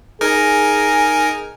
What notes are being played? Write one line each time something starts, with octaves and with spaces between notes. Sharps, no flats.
D#4 G#4 A#4 G#5